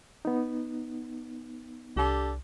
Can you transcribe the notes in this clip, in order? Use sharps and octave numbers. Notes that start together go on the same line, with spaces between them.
B3 D#4
C2 D4 G4 A4